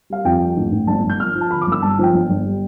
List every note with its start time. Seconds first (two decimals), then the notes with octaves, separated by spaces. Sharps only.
0.10 G3 F5
0.24 F2 G5
0.41 G3
0.57 A1
0.72 A1
0.87 G1 A5
1.04 G1
1.10 G6
1.20 F3 F6
1.35 F3
1.41 A5
1.51 D3 B5
1.61 D6
1.67 G1
1.72 E6
1.82 G2 A5
1.99 F3 G5
2.13 G1
2.30 G1
2.46 G3